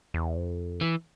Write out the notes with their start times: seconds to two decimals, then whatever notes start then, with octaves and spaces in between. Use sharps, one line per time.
0.14 E2
0.36 F2
0.81 E3